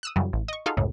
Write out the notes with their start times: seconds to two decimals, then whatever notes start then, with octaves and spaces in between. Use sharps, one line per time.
0.03 D#6 E6 F#6
0.16 F#2 C#3 E3 F#3 G3
0.33 A1
0.48 D#5 C#6
0.66 D#4 F4 F#4 G#4 A4 F5
0.77 C#2 F#2 A2 C#3